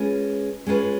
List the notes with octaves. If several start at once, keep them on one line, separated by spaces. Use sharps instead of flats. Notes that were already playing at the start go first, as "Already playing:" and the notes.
Already playing: G#3 C#4 F4 B4
G#3 C#4 F4 B4